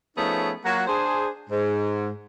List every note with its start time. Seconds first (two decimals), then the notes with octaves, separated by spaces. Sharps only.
0.16 F3 A3 B3 C#4 D#4 G#4
0.64 F#3 A#3 F4 F#4
0.87 D4 G#4 C5
1.50 G#2